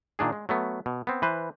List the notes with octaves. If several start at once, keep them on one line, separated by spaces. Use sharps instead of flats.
A#2 D#3 D4 G#4
G#3
F#3 A3 B3
B2
B3 C4
E3 B4 C5